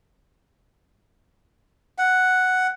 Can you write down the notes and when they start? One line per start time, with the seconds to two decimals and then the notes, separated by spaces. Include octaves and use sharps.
1.98 F#5